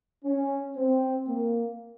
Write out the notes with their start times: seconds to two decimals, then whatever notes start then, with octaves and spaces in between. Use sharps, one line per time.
0.25 C#4
0.77 C4
1.27 A#3